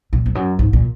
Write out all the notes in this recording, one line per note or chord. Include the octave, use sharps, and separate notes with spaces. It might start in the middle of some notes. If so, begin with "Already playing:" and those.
A#2
F2
F#2
G#2
A#2